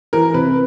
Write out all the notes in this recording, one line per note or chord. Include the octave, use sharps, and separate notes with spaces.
E3 A#4
C3 B4